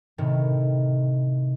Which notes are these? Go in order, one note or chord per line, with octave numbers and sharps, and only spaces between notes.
A2 C3 D#3